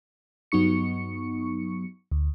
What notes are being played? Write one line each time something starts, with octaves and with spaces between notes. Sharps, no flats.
G2 F#3 B3 D#4 C#6 C#7
D2